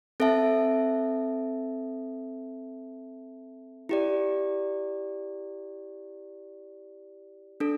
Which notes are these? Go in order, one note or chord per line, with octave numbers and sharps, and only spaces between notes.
C4 A4 E5 A5
E4 G4 D5
D4 A4